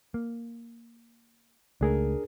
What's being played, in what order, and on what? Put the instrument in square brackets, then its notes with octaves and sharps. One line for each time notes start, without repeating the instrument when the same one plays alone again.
[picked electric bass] A#3
[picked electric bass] C#2 A3 [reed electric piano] D4 G#4 A#4